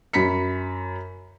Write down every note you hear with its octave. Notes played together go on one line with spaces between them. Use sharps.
F#2 B5 B6 C#7